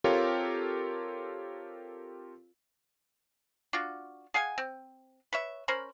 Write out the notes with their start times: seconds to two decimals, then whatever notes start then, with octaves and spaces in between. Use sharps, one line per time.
0.04 C4 F4 G4 A4 A#4 C#5
3.73 D4 F4 F#4
4.34 G#4 F5 F#5 G#5
4.58 C4
5.33 B4 C#5 E5
5.68 C#4 A#4 C5 B5